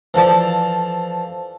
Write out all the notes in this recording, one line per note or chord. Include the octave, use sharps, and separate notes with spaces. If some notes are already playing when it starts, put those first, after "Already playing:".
E3 F3 A4 D5